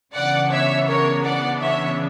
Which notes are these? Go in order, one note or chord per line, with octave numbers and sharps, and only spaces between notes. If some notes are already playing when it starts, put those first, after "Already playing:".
C#3 E3 B3 D4 D5 F#5
C#5 E5
A#4 C#5
D5 F#5
C#5 E5